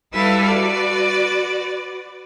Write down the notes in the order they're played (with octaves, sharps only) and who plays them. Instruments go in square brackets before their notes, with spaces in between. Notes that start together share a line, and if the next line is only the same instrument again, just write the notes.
[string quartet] G3 E4 A4 B4 E5 F5
F#4 B4 D5